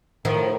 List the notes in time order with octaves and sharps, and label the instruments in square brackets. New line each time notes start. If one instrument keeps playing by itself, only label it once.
[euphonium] A2 [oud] D#3 F3